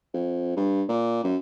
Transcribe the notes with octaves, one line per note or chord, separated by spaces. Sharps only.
F2
G2
A#2
F#2